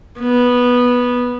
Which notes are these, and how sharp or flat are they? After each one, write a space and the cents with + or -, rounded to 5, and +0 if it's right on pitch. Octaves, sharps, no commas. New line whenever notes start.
B3 -10